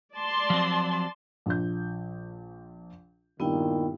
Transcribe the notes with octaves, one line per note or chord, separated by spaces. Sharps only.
D5 A5 C6
F3 F#3 C4
A#1 F3 G6
G2 A#2 D#3 B3 E4 G5